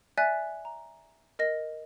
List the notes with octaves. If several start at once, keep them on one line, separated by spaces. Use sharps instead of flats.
D5 E5 G#5 F#6 B6
A#5
A#4 D#5 A#6